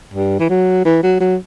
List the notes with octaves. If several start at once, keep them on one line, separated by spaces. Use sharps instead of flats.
G2
E3
F#3
E3
F#3
F#3